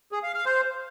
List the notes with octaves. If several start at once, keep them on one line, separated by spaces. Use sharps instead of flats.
G#4
F5
F5
C5